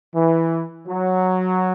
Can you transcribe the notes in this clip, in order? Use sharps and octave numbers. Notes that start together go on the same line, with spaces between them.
E3
F#3